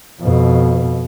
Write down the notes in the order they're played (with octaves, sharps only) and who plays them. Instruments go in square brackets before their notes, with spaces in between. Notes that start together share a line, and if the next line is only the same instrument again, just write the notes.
[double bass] F2 B2